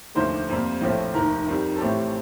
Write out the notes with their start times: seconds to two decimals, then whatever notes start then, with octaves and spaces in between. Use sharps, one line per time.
0.15 F1 D#2 D3 F3 A3 C5
0.49 F2 C3 G3 A#3
0.81 A#1 A2 F3 A3
1.14 F1 D#2 D#3 A#4
1.47 F2 D#3 G3
1.76 A4
1.81 A1 A2 A3 C4 G4